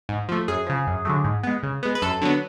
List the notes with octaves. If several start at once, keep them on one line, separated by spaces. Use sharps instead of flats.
G#2
F3 A3
F#2 G#4
C#3 F3
F#2
D3 F#3 A3
G#2
G#3 B3
C#3
G#3 B3
B4
F#2 A4
D3 F#3 B3